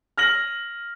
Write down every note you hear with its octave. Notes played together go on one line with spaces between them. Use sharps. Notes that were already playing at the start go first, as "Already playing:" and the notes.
F6 A#6 F#7